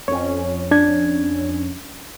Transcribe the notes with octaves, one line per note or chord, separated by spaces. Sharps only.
F2 C#4 C#5
D4 G#6